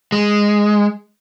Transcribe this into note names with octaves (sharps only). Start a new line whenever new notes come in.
G#3